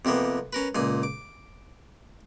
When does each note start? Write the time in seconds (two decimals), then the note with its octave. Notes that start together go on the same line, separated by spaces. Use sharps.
0.05 F2 C3 A#3 B3
0.53 C#4 A#4 B4
0.75 C#2 A#2 G#5
1.03 D6